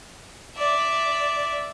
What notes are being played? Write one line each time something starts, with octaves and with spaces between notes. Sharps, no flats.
D5 E5